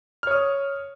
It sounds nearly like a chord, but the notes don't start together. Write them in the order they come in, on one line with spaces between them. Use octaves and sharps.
F6 C#5 D#6